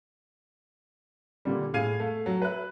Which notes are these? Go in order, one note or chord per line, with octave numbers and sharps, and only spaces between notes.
A#2 D3 G3
A2 G#4 F5 G#6 D#7
A3 F5
F#3
B4 E5 F#6